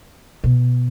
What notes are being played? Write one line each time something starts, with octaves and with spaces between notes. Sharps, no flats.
B2